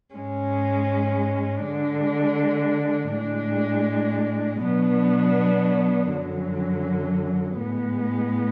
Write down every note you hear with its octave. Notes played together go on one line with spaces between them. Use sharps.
G#2 G#3 C#4
D3 G#3 D4
A2 G#3 D4
B2 F#3 B3 D4
F#2 D3 F#3
A2 G#3 B3